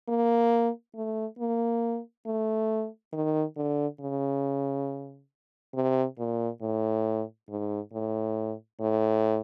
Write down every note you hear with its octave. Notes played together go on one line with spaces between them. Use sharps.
A#3
A3
A#3
A3
D#3
D3
C#3
C3
A#2
A2
G#2
A2
A2